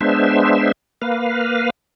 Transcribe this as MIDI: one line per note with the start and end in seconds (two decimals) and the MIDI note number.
0.01 0.72 56
0.01 0.72 59
0.01 0.72 62
0.01 0.72 72
0.01 0.72 76
1.02 1.70 58
1.02 1.70 71
1.02 1.70 77